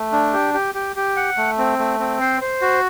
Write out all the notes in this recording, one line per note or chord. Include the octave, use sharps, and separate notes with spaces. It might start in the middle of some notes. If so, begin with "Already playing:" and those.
Already playing: A3
D4
G4
G4
G4
G4
F#5
A3
C4
A3
C4
C5
C5
F#4